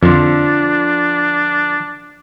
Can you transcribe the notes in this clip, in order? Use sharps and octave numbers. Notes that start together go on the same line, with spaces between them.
F2 D3 F3 D4